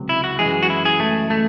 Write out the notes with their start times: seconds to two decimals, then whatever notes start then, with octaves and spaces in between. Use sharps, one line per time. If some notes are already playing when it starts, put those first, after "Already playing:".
Already playing: C#2 C3 F#3
0.09 E4
0.24 F#4
0.39 F#2 E3 G#3 G#4
0.63 F#4
0.70 E4
0.85 G#4
1.00 A3
1.30 A3